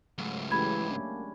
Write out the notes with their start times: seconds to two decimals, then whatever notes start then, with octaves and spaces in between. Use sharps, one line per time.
0.18 C#2 G#2 F#3 A3
0.51 C#3 E3 G#3 A3 G4 B5 G#6
0.90 A#3 C#4 D4